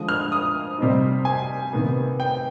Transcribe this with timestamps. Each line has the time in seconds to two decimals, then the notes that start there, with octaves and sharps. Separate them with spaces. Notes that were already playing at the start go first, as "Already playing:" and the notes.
Already playing: D3 F3 G#3 D#6
0.09 F6
0.32 D#6
0.78 C3 G3 C4 D#4
1.25 G#5
1.73 C3 D#3 B3
2.20 G5